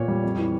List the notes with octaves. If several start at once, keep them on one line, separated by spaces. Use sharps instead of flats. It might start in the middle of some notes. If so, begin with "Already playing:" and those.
Already playing: A#2 B3 C#5
G3
F2
E3